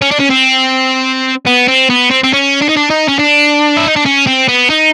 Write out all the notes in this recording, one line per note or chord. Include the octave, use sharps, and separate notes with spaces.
C#4
D4
C#4
C4
B3
C4
B3
C4
C4
C#4
D4
D#4
D4
D#4
C#4
D4
E4
D#4
D4
C#4
C4
B3
D#4